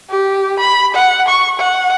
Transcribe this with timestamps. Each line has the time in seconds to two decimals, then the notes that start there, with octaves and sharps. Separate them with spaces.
0.11 G4
0.60 B5
0.95 F#5
1.28 C#6
1.60 F#5